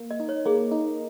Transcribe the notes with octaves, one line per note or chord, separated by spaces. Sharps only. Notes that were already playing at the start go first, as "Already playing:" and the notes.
Already playing: A#3
D#5
D#4
C#5
A#3 G#4
D#4